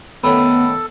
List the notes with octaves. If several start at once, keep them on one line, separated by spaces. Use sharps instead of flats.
D#3 A3 B3 C#4 A4 B5